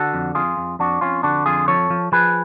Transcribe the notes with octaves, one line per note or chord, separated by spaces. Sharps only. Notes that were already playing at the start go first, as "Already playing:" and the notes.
Already playing: D3 F#4 A4
F2
F2 F4 G#4
F2
F2 D4 F#4
F2 C#4 F4
D3 D4 F#4
F2 F4 G#4
F3 A4 C#5
F3
F3 G#4 B4